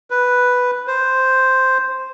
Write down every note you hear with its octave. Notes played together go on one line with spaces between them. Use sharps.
B4
C5